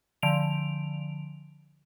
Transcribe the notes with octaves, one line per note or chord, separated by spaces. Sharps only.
D3 F3 D7 F7